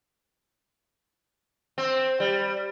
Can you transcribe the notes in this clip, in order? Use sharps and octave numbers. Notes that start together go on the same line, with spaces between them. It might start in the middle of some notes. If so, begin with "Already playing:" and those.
C4
G3